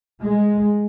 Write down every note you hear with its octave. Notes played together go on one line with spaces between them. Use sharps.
G#3